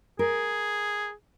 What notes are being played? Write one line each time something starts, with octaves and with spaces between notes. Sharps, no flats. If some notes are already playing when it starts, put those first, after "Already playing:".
G#4 A#4